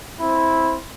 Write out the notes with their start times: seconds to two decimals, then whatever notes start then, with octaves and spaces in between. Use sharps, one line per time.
0.21 C4 E4